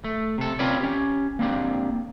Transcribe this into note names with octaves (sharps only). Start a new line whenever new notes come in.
A3
C3 A4
C4 C#4 F4 B4 C#5 D5
C#4 G4
A#3 C4 D4 G4